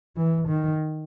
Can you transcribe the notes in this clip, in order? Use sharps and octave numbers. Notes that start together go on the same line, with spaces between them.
E3
D#3